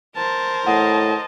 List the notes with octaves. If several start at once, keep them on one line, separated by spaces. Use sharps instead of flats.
A#4 C5 A5
A2 D#5 F#5 A5